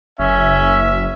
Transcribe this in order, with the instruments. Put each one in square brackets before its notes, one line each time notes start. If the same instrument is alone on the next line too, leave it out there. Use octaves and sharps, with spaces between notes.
[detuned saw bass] F#1 [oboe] C#4 [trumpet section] E5